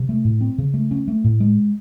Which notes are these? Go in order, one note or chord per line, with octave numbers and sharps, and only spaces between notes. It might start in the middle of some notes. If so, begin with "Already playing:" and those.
Already playing: C3
A3
A2
C4
C#3
A3
C#4
A3
A2
G#3